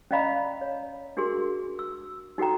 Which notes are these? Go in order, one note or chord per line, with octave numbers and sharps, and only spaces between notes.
C#4 D5 D#5 F5 A#5 B5
C#5
D4 F#4 G#4 A#4 C6
E6
D#4 F#4 A4 G5 A#5